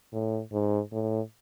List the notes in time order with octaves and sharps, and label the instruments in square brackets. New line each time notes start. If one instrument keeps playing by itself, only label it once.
[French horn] A2
G#2
A2